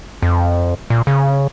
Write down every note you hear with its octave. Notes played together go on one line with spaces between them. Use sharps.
F2
A#2
C#3